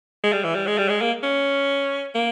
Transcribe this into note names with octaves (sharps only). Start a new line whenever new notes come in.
G#3
G3
E3
G3
G#3
G3
G#3
A#3
C#4
A#3